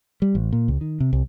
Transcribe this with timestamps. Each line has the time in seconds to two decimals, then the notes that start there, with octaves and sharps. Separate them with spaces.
0.22 G3
0.35 A1
0.53 A#2
0.68 C#2
0.81 D#3
1.00 C3
1.13 C2